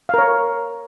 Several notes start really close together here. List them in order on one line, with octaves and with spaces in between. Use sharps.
F5 A#4 C#5